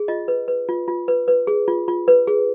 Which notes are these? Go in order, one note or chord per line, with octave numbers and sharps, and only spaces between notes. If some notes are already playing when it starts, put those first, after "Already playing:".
Already playing: G#4
F4 D#5
B4
B4
F4
F4
B4
B4
G#4
F4
F4
B4
G#4